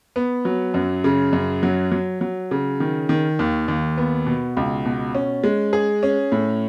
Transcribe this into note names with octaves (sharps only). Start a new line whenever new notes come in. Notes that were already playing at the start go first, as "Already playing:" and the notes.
B3
F#3
F#2
C#3
F#2
F#3
F#3
F#3
C#3
D#3
D#3
D#2
D#2
B3
B2
C#2
B2
C#4
G#3
G#4
C#4
A2